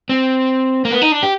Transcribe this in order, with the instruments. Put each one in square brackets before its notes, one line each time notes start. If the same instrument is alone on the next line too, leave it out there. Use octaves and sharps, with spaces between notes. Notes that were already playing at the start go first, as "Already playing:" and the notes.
[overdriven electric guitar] C4
A#3
B3
D#4
D4
G4